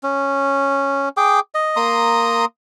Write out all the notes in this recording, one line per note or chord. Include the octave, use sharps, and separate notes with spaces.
C#4
G#4 G5 D6
D#5
A#3 A#5 C6 D#6